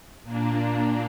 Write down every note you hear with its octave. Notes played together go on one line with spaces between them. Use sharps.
A#2 A#3 D4